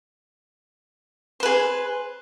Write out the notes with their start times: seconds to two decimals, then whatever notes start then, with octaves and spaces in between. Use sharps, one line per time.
1.40 C5
1.43 B4
1.46 G#4